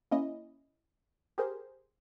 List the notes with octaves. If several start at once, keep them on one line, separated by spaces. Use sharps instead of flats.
A#3 C#4 E4 D#5
G4 G#4 A#4 C5